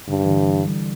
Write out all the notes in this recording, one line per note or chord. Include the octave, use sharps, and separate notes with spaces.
G2 D3
E3
D3
E3
G3